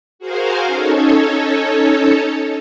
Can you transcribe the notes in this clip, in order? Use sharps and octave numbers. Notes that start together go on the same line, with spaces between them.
F#4 G#4 A#4 C5 F5
C#4 D#4 A4 C#5